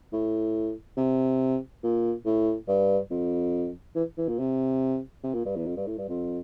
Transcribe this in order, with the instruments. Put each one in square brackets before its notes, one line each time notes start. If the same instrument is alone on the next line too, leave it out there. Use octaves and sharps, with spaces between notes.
[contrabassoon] A2
C3
A#2
A2
G2
F2
E3
E3
A#2
C3
C3
A#2
G2
E2
F2
G2
A2
G2
F2